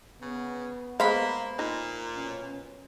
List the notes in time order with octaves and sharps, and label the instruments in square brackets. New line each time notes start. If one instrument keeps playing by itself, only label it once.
[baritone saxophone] C#3 [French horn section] B3
[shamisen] G#3 F5 [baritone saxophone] A#3 [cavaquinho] C5 B5
[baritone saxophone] A#2 [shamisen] D#4
[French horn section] B2 C#4